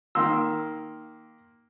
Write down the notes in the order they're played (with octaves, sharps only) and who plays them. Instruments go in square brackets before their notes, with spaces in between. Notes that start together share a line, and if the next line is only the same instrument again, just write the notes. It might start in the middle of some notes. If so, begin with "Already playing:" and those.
[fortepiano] D#3 A#3 C6 E6